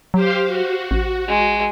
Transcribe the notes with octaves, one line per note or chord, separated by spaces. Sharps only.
F#3 G4 C5 F5
F#4
A1
G#3